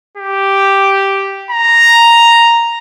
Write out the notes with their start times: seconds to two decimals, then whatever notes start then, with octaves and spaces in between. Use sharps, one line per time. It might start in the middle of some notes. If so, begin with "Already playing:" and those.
0.17 G4
1.51 A#5